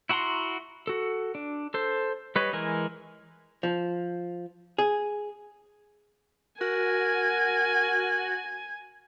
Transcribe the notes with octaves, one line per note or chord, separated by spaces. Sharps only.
E4 F#4 F#5 A#5 C6
F#4 A4
D4
A4 C5
G3 B4 C#5 D#5
E3 G#3 A#4 G#5
F3
G#4
F#4 A#4 G#5